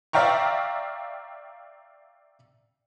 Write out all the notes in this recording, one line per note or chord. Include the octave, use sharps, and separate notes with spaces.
D5 E5 F5 G5 A#5 C#6